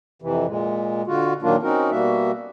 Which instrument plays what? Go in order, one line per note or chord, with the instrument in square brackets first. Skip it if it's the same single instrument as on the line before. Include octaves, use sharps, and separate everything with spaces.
[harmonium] F2 C3 E3
A#2 G#3
D3 F4 F#4
A#2 D#3 F#3 A#3 D4 F4
C4 C#4 D#4 F#4 A#4
B2 G3 A#3 F#4 E5